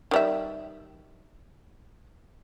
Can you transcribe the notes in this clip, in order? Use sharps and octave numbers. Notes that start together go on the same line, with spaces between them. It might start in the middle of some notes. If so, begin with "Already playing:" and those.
D#3 G3 E5